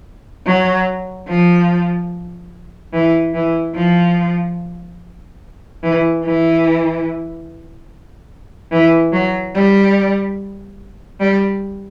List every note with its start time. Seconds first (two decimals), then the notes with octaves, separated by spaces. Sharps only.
0.45 F#3
1.28 F3
2.93 E3
3.34 E3
3.75 F3
5.83 E3
6.23 E3
8.71 E3
9.13 F#3
9.54 G3
11.19 G3